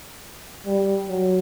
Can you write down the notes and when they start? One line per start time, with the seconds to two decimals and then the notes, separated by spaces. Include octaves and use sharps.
0.66 G3
1.09 F#3